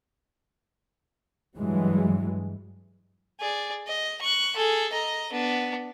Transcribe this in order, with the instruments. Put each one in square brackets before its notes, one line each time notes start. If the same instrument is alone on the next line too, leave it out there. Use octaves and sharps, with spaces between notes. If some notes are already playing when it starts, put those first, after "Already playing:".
[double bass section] G2 E3 F#3 G#3
[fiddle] G#4 D5
D#5
C#6 F#6
G#4 A4
D#5 A#5
B3 D4